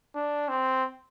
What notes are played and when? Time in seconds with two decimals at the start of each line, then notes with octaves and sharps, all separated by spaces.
0.16 D4
0.48 C4